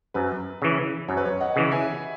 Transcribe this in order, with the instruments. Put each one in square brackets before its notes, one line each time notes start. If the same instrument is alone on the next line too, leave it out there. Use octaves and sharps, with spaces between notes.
[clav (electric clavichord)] F#2 [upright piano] B4
[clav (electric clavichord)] C#3 E3
[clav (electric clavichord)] F#2 [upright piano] C#5
[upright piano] B4
C#5
D#5 F#5
[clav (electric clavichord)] C#3 E3
[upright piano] E5 G#5